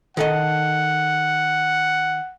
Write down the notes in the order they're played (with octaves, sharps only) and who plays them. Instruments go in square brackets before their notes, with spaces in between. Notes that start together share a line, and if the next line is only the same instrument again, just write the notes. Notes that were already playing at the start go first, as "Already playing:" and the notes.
[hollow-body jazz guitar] D#3 A4 D#5 [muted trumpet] F#5